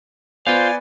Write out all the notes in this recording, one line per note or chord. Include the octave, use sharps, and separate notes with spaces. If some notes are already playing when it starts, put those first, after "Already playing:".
B3 F4 C5 D5 F5 G#5